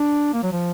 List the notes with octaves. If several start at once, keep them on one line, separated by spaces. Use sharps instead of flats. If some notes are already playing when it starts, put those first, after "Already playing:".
Already playing: D4
A#3
F#3
F3